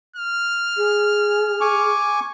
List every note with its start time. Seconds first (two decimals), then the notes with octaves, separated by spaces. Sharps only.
0.16 F6
0.77 G#4
1.61 G#5 C#6 D6